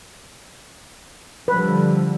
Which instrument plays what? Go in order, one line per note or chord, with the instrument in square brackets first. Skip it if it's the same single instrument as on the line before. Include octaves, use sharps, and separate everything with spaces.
[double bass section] D3 F3 G3 [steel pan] B4